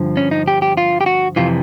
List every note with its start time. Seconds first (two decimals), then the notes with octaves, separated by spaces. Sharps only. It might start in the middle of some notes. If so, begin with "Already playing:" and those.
Already playing: G2 D3 F3
0.17 C#4
0.31 D#4
0.48 G4
0.62 G4
0.77 F4
1.01 G4
1.06 F#4
1.36 F2 C3 E3 F4